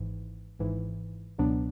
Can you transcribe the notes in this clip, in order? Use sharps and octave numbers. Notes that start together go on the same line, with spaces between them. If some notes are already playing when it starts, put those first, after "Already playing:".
Already playing: G#1 G#2 E3
G#1 G#2 E3
C#2 B2 F#3 B3 D4